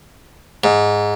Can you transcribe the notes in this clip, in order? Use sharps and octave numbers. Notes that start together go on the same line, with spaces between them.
G#2